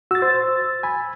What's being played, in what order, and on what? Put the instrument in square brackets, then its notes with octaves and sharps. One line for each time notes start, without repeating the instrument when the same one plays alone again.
[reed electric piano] F#4 [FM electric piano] E6 A6
[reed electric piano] C5
G#5 B5